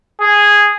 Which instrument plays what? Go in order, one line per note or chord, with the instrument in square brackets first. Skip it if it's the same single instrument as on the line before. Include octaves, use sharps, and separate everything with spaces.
[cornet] G#4